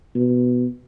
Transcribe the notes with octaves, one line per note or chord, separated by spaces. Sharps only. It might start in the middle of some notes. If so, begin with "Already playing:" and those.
B2